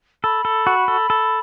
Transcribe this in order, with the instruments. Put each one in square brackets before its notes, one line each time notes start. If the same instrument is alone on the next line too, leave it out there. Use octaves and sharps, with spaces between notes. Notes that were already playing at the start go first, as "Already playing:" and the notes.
[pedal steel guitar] A4 [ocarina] B5
[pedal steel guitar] A4
F#4
A4
A4